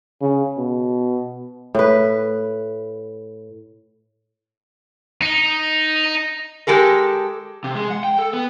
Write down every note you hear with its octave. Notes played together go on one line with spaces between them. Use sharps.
C#3
B2
A2 B4
D#4
G#3 G4 A4 A#4
C3
G#3
F#5
G5
A4
B3